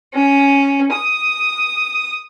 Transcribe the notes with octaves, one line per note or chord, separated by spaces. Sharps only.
C#4
D#6